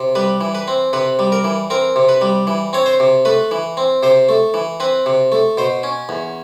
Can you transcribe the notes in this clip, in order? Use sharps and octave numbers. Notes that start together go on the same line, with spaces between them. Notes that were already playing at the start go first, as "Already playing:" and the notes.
Already playing: C3
G3 B4
E3
B4
C4
C3 B4
G3
A#4
E3
C4 A#4
C3
B4
G3
E3
C4 C#5
C5
C3
A3 B4
E3
C4
C3 C5
A3
E3
C4 B4
C3
A3
B2 C5
C#4
E2